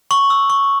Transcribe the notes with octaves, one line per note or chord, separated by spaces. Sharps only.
C#6 F#7
E6
C#6